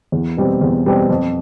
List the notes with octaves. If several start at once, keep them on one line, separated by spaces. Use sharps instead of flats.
E2
B2 G3 C4
E2
B2 G3 C4
F2